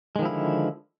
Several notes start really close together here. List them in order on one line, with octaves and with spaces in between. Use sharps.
G#3 D#3 F3 E4 D3